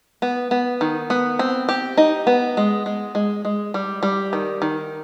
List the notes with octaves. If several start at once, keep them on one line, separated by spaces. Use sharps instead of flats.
B3
B3
D#3
B3
C4
G4
D#4
B3
G#3
G#3
G#3
G#3
G3
G3
D#3
D#3